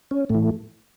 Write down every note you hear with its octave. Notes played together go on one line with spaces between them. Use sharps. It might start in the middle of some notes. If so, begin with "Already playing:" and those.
C#4
A2 E3 A3